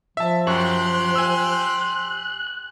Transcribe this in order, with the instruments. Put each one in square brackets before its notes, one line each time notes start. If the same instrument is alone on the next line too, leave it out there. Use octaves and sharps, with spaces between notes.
[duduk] F3 [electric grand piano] E5 A5
[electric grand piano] F#2 C#6 [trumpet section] G4 C6 [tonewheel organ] F#6
[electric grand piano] G#5 E6